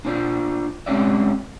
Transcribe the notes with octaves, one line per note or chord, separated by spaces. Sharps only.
D4 F4 C5 D5
G#3 C4 C#4 G4 D5 E5